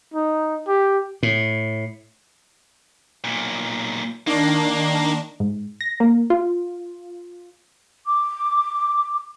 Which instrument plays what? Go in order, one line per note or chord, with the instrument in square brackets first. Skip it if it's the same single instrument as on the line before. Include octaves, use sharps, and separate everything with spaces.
[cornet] D#4
G4
[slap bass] A2
[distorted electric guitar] B1 A#2
[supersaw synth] D#3 D4 [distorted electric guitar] A#3
[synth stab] G#2
A#6
A#3
F4
[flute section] D6